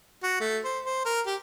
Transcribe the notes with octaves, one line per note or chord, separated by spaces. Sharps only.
F#4
A3
C5
C5
A#4
G4